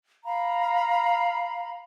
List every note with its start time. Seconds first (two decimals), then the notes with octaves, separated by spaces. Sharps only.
0.25 F5 A#5 B5